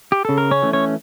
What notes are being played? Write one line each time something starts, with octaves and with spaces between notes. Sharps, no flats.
G4
C#3 A4
A#4
C#4 C#5
E3 A3
C#4 C#5